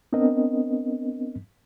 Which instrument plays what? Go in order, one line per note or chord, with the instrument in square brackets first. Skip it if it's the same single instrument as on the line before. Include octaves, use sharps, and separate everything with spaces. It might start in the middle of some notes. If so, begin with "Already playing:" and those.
[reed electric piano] B3 C4 D4 A#4 D#5